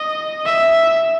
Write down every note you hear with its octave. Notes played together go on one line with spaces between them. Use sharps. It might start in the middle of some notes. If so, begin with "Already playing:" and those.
Already playing: D#5
E5